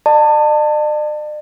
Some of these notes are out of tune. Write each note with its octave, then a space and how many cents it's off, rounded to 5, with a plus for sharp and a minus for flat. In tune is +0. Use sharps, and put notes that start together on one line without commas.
D5 +45 A5 +25